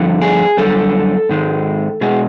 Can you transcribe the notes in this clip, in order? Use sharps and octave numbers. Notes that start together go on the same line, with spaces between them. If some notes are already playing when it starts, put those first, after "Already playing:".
Already playing: G2 D3 F3
G#4
F#2 D3 G3 A4
G#2 D#3 G#3
B2 G#3 G#4